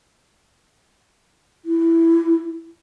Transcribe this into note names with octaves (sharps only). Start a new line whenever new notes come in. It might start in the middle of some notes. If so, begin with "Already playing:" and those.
E4